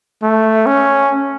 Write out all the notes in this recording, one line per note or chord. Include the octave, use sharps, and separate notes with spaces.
A3
C#4